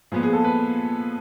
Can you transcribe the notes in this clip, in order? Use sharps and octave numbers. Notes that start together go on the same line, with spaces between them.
A#2 F3 G#3 B3 G#4
G#4
A4
B4